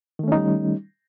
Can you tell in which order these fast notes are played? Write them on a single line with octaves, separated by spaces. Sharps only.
D#3 A3 C#4 D#4 G3